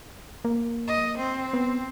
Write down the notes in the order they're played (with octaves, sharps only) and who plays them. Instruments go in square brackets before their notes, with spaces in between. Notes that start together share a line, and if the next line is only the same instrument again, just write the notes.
[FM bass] A#3
[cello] D#5
C4
[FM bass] B3